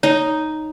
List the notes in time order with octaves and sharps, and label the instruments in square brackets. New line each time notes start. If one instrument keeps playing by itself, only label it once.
[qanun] D#4 [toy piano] C#5